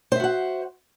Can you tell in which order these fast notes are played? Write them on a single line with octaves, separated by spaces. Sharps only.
C5 E5 F#4 F#5